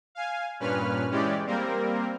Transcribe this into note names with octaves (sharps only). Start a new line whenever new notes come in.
F5 G#5
G2 A#2 C#4 B4 F6
E3 G#3 C#4 G4 D5
G3 A#3 C4 A#4